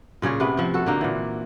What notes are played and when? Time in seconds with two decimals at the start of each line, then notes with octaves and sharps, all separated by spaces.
0.22 A#2 C#3 G#4 C#5
0.40 C3 A3 B3
0.57 F3 C4
0.74 F#4 A4
0.86 D3 A#3 D#4
1.01 A#2 E3